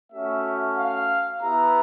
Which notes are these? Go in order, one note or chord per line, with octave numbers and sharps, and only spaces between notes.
A3 C#4 F#4 E5
F5
B3 E4 G4 A#5